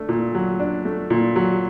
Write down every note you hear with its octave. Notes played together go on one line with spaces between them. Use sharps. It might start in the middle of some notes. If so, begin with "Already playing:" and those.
Already playing: A3 D4
A#2
F#3
D4
A3
A#2
F#3